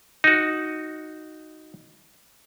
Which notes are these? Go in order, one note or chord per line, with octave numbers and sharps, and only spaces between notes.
D#4 F#4